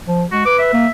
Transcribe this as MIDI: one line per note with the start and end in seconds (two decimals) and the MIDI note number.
0.07 0.24 53
0.32 0.45 56
0.32 0.42 66
0.46 0.73 71
0.46 0.58 86
0.59 0.91 76
0.73 0.87 58